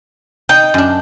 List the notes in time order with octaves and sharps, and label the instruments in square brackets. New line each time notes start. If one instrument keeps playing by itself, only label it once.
[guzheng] D#4 [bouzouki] G5
[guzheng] F#2 D4